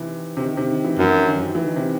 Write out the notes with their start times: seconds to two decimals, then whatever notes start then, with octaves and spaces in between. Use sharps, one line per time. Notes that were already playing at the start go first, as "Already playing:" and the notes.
Already playing: C3 D#3 E3
0.37 C3
0.42 D#3
0.57 C3
0.71 D#3
0.85 E3
0.99 F#2 F#3
1.26 D#3
1.55 E3
1.66 D#3
1.76 C3